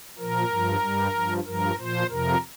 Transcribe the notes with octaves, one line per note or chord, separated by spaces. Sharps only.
A#2 F3 A#4
G2 F3
G2 G3
G2 F3
G2 F3 A#4
A#2 F3 C5
F2 C3 F3 A#4